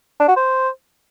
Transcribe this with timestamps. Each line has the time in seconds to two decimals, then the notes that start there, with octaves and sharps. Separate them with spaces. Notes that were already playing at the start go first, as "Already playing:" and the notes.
0.20 D4
0.28 F#4
0.37 C5